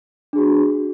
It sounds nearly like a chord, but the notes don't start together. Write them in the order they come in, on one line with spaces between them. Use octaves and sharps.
D4 G#4 F#4